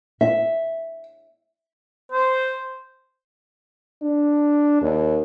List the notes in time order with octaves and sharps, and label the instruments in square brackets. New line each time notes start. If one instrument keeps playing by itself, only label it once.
[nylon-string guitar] E5
[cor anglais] C5
[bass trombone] D4
D#2